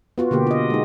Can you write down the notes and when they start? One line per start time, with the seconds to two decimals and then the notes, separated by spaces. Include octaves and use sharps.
0.18 B3 F4 F#4
0.31 B2 D3 A#3 G4
0.47 F4 D#5
0.70 G#3 D#4